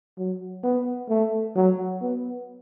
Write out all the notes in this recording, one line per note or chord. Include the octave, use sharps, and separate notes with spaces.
F#3
B3
A3
F#3
B3